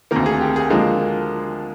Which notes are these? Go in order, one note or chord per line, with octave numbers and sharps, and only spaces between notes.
D2 C3 D#3 A#3 A#4
G#4
G4
G#4
D3 F3 G#3 A#3 A#4